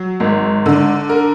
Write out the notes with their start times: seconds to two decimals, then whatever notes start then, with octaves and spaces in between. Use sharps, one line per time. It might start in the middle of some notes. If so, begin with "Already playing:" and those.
Already playing: F#3
0.20 G#1
0.66 D3
1.09 A#4